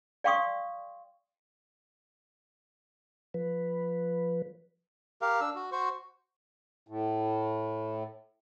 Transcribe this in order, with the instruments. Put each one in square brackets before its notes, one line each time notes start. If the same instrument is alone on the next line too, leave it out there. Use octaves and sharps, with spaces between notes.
[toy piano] D5 F5 G5 C6 C#6 D#6
[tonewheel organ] F3 B4
[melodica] G4 A#4 F5
D4 E6
F#4
F#4 C5 C#6
[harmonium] A2